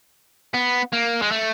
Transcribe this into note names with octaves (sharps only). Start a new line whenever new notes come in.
B3
A#3
G#3
A3